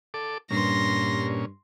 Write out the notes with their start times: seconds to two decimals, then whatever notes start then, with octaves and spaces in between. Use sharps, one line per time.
0.14 A4 D6
0.51 G2 A#2 C#4 C6 A#6